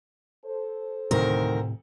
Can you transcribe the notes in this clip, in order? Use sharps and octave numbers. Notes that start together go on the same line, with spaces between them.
A4 C5
D2 A2 C3 D#3 C4 A#4